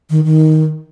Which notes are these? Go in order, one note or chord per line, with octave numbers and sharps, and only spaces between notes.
D#3
D#3